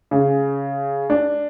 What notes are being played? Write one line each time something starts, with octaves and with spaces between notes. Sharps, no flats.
C#3
D4